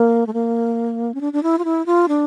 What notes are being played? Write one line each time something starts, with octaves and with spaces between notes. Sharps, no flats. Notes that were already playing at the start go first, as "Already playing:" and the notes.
Already playing: A#3
A3
A#3
C#4
D4
D4
E4
F4
E4
F4
D4